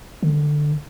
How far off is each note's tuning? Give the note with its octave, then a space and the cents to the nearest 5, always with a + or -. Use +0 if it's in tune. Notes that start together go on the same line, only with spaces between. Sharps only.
D3 +15